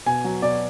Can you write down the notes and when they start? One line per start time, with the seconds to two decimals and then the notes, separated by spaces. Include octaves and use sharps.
0.06 B2 G#5
0.24 F#3
0.42 B2 D5